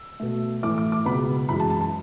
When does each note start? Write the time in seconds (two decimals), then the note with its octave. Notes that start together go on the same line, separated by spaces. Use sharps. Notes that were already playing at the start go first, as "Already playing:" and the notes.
Already playing: E6
0.20 B2 A3
0.63 A2 E3 A3 D6
0.78 D6
0.92 D6
1.06 C#2 B2 G#3 B3 B5
1.49 F#2 E3 G#3 B5
1.60 A5
1.70 A5
1.81 A5